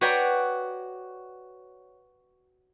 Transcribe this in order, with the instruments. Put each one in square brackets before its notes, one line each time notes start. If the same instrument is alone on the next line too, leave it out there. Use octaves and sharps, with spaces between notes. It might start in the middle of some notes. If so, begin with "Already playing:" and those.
[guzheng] F#4 B4 C#5 D5 G5 A#5